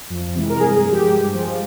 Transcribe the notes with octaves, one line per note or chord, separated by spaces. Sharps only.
F2
C3 E3 G#3
A#4
G2 G#4
G#4
F3 G#3
G4
G2
F3 G#3